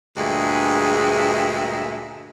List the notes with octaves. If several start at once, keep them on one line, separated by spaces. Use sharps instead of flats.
D2 G2 A#2 G#3 G#4 E5